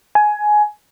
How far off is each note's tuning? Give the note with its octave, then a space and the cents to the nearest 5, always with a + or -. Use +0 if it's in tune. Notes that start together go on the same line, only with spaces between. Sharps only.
G#5 +15